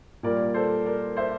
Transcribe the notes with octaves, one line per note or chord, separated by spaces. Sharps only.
A#2 G3 A#4 D5
A4 C5
A#4 D5
C5 E5